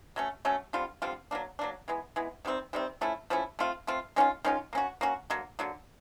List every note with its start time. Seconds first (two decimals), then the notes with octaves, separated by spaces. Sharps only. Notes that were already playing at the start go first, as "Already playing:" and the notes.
0.16 F#3 A3 C#4
0.45 F#3 A3 C#4
0.73 D3 G3 C4 F4
1.02 D3 G3 C4 F4
1.31 F#3 A#3 D4
1.59 F#3 A#3 D4
1.88 E3 G#3 B3
2.16 E3 G#3 B3
2.45 C3 D#3 G3 C4
2.73 C3 D#3 G3 C4
3.01 F3 A3 C#4 E4
3.30 F3 A3 C#4 E4
3.59 A3 C4 F4
3.87 A3 C4 F4
4.16 D#3 G#3 C#4 F4
4.44 D#3 G#3 C#4 F4
4.73 A#3 C#4 F#4
5.01 A#3 C#4 F#4
5.30 D3 F#3 A#3
5.59 D3 F#3 A#3